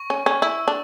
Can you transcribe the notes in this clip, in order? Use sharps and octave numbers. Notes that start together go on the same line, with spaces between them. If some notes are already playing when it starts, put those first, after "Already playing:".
Already playing: C#6
C#4
C#4
E4 E6
E6
D4